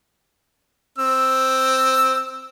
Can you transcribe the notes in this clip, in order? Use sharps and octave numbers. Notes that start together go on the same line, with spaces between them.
C4 E6